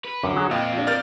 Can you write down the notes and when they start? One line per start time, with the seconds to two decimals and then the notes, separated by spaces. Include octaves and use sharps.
0.04 B4
0.23 F#2 D3 D6
0.36 F#3 G#4
0.51 A#2 C4 F4 D#5 F5 G5 B5
0.73 F3 D4
0.87 A#4 D5 F6 G6 A6